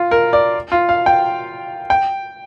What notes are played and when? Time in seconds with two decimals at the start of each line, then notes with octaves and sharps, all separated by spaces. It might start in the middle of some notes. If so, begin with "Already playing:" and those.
Already playing: F4
0.11 A#4
0.33 D5
0.72 F4
0.89 F5
1.06 G5
1.90 G5